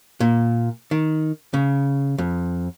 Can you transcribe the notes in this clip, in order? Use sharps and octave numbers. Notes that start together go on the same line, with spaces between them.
A#2
D#3
C#3
F2